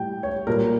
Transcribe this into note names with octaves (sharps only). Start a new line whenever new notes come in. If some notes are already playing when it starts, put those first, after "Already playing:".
Already playing: A2 G3 G5
C#5
A#2 G3 A#4